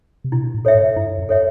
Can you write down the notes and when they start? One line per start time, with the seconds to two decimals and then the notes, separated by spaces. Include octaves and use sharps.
0.24 C3
0.32 B2 E4
0.54 A2
0.65 A4 C#5 E5
0.75 G#2
0.96 G2 E4
1.18 F#2
1.29 A4 C#5 E5